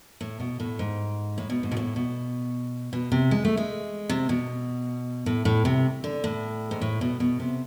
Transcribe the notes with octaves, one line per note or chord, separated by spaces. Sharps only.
A2
B2
A2
G#2
A2
B2
G#2
B2
A2
B2
B2
C3
G#3
A3
G#3
C3
B2
A2
A2
C3
D3
A2
G#2
A2
B2
B2
C3